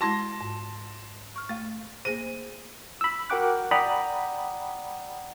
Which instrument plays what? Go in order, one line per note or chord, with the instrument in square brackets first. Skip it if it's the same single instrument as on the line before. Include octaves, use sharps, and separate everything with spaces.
[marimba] G#3 E4 F#4 [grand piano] A5 C6 A#6
[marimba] G#2
C#6 F6
A3 F5
[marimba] A#3 G#4 C5 [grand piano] D#7
[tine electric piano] B5 E6
F#4 A#4 F#5 G5 D6 F#6
D5 F#5 G5 A#5 B5 D#6